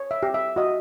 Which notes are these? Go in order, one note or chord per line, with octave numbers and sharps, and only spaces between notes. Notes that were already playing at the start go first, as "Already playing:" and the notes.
Already playing: C#5
E5
G4
E5
F#4 D#5